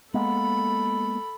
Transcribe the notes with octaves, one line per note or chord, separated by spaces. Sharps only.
G#3 A#3 B3 A4 B5